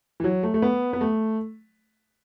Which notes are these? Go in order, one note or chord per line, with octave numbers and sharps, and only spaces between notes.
E3
F#3
A3
A3
B3
B3
A3